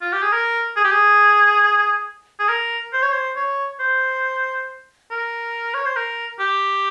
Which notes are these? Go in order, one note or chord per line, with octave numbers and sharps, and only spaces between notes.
F4
G4
G#4
A#4
G#4
G4
G#4
G#4
A#4
C5
C#5
C5
C#5
C5
A#4
C#5
C5
A#4
G4